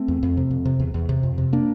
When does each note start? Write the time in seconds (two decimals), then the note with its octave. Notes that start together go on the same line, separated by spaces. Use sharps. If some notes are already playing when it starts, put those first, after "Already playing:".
Already playing: A3 C4
0.08 E2
0.23 F2
0.37 C3
0.51 F2
0.65 C3
0.80 E2
0.94 E2
1.09 C3
1.23 F2
1.38 C3
1.53 A#3 D4